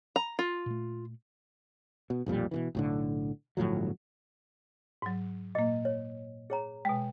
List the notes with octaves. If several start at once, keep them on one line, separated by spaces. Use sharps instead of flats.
A#5
F4
A#2 A3
B2
B1 F2 A#2 G3
B2 D3 E3
B1 A2 D3
G1 A2 F3 F#3
G#2 F#3
A#2 A#3 D#5
C#5
G#4 C#5 A#5
B2 G#3 G5